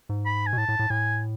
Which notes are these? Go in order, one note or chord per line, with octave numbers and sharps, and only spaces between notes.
G#2
B5
G#5
B2
A2 A5
A2
A2
A2 G#5